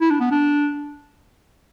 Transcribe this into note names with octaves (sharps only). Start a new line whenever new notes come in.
E4
D4
B3
D4